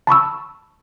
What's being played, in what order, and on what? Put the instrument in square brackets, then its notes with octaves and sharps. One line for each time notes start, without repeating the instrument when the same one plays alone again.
[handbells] A5 B5 C#6 E6